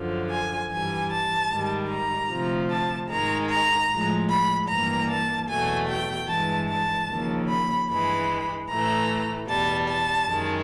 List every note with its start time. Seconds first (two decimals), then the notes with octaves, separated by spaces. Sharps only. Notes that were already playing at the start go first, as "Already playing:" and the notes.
Already playing: F#2 D3 F3
0.30 G#5
0.70 G2 E3 G3 G#5
1.11 A5
1.50 G#2 D#3 G3
1.90 A#5
2.30 D2 C3 F3
2.70 A5
3.10 G#2 D#3 G#3 A#5
3.49 A#5
3.90 A2 F3 G#3
4.30 B5
4.69 G2 E3 G3 A#3 A#5
5.10 A5
5.49 E2 B2 F#3 A3 G#5
5.89 G5
6.29 G2 E3 G#3 A5
6.69 A5
7.09 D#2 C#3 F3 A#3
7.49 B5
7.89 G2 E3 G#3 B5
8.69 A2 E3 A3 A#5
9.48 E2 B2 G3 A5
9.88 A5
10.28 F#2 D#3 G#3